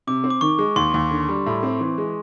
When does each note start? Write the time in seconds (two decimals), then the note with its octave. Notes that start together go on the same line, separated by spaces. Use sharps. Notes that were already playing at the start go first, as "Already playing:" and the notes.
0.07 C3 D6
0.24 C4
0.30 D6
0.41 D#3 C#6
0.58 G#3
0.76 D#2 C6
0.94 D#2
1.11 D3
1.29 G3
1.46 A2
1.63 C4
1.81 E3
1.98 G#3